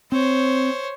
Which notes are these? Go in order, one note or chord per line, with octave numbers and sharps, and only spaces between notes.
C4 C5 C#5